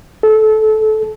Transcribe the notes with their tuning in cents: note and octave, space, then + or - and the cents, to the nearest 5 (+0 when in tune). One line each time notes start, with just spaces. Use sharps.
A4 -20